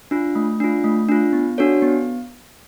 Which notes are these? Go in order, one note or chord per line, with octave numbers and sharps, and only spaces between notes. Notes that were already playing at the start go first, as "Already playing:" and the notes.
D4 F4
A3
D4 F4
A3
D4 F4
B3
D4 F#4 A4 C#5
B3